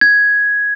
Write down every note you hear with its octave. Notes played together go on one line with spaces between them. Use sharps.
G#6